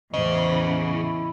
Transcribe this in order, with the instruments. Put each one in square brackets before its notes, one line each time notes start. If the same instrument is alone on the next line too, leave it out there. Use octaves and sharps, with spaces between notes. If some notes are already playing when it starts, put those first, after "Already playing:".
[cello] E2 E3 [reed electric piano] A2 D#5 [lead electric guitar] C#3 [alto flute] C5
[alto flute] E4